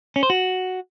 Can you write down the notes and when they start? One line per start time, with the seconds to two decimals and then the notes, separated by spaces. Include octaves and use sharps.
0.16 C#4
0.23 C5
0.30 F#4